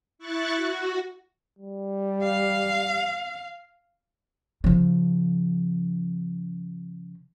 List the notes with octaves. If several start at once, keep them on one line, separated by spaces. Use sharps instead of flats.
E4 C#6 F#6 A6
F#4
G3
F5
C#3 F3